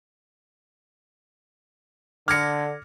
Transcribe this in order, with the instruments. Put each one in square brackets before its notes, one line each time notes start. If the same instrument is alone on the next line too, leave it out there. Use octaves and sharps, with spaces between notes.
[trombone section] D3 [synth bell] D6 G#6 A#6 [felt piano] F6 C#7